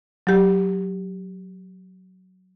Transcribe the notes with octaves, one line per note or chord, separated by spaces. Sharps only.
F#3 G4